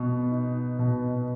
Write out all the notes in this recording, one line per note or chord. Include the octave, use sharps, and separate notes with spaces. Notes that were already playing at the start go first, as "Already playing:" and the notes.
Already playing: B2 B3
D#4
B2